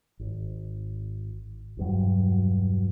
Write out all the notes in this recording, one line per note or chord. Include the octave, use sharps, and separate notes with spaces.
G#1
E1 G2 F#3